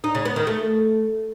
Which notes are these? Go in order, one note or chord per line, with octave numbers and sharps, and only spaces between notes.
D#4
C#3
B3
D#3
A3